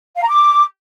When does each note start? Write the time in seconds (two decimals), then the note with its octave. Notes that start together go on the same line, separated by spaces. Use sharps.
0.16 F5
0.22 A#5
0.28 D6